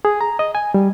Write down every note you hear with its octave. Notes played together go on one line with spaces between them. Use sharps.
G#4
A#5
D#5
G#5
G3